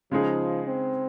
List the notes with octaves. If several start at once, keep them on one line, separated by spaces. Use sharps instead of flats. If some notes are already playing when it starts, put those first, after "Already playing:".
C#3 F3 G#3 D#4 G#4
C4